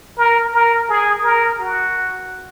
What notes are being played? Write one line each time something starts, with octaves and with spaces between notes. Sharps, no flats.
A#4
A#4
G#4
A#4
F#4